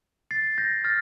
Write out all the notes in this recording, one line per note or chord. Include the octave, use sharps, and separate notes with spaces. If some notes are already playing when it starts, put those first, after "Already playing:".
A6 C7
G6 A#6
F6 A6